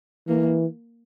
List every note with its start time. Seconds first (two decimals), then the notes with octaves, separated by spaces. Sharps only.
0.27 E3 A#3